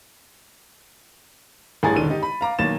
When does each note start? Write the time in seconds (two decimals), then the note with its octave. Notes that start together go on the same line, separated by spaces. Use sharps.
1.83 A1 G2 G#4 G#5 A#5 A6
1.95 E1 D3 D#3 D#7
2.10 D#4 G4
2.23 B5
2.41 F5 A#5 D6
2.59 B1 D#3 A#3 A6 E7